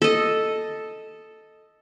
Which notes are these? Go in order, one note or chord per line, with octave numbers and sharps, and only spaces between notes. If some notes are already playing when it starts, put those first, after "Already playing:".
A4 D#5